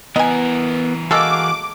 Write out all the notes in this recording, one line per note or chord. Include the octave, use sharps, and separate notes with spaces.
E3 B3 A#4 D#5 G#5
G#3 A#3 F#4 G#4 A4 F5 D6